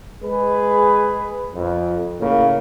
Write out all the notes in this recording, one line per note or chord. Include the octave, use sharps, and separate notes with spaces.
G#3 G#4 B4
F2
A2 C#3 A#3